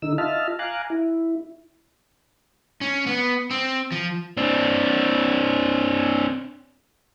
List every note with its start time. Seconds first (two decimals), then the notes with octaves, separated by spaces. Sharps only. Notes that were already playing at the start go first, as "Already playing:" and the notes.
0.02 D3 D#4 E6
0.18 F4 D#5 E5 A5 F6
0.59 F5 G#5 A#5 D6 F#6
0.90 E4
2.81 C#4
3.07 B3
3.51 C4
3.92 F3
4.37 C4 D4